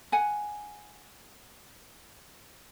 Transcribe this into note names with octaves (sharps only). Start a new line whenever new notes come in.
F#5 G#5